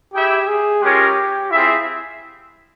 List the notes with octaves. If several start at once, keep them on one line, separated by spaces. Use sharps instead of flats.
E4 G4 G#4 E5 G5
G#4
G#3 C#4 F4 G4 A#4 C#5
C4 E4 F4 G#4 E5